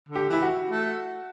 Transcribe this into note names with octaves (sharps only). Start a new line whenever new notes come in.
D3
G4
E3 E4
F#4
A3